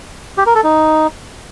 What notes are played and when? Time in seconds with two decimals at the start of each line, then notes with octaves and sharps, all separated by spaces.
0.38 G4
0.46 A#4
0.55 A4
0.64 D#4